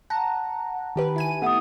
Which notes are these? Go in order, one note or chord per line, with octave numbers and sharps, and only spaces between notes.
F#5 A5 A#5
D#3 G4 B4
E4 G#5 D#7
A3 B3 E4 F#5 D#6